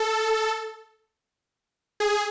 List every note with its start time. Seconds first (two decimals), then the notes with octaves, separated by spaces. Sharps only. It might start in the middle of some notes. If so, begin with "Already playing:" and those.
Already playing: A4
2.00 G#4